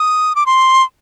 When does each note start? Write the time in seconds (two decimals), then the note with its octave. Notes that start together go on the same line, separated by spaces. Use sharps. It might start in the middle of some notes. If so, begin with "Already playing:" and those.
Already playing: D#6
0.36 D6
0.46 C6